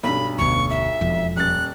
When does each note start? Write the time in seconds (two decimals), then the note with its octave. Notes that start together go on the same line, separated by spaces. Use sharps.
0.03 B1 G2 B5
0.38 F1 D2 B2 C#6
0.70 E5
1.01 E1 F2
1.36 D#1 F#6 A6